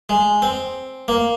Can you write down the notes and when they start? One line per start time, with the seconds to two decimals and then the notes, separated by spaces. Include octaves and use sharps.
0.09 G#3
0.42 C4
1.08 A#3